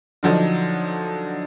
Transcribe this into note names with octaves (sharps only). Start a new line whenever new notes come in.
D3 F3 F#3 D4 D#4